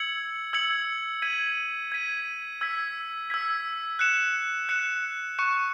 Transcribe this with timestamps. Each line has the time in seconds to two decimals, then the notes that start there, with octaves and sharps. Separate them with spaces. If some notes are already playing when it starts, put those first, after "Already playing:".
Already playing: E6 G#6 C#7 F#7
0.53 E6 G#6 C#7 F#7
1.22 G#6 B6 D#7
1.92 G#6 B6 D#7
2.61 E6 G#6 B6
3.30 E6 G#6 B6
3.99 F#6 C#7 E7
4.69 F#6 C#7 E7
5.39 C#6 F#6 C#7 E7